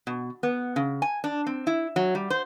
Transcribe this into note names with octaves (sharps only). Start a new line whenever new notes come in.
B2
B3
C#3
G#5
D4
C4
E4
F#3
G3
C5